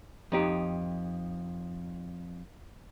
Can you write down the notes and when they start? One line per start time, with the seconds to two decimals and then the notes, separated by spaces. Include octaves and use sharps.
0.32 F2 D#4 G4